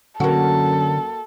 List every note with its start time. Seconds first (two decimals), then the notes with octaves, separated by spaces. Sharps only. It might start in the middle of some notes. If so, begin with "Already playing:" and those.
0.20 F#2 D3 A#3 F#4 A4